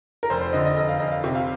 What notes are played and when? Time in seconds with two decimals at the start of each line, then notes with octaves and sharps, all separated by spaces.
0.23 A#4
0.30 F1 C5
0.41 C5
0.53 D3 D#5
0.65 D#5
0.76 F1 D#5
0.89 F5
1.00 F1 D#5
1.12 F5
1.24 C3
1.35 F5